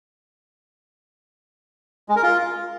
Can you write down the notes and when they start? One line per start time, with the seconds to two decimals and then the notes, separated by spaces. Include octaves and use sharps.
2.09 G#3
2.16 A#4
2.23 F4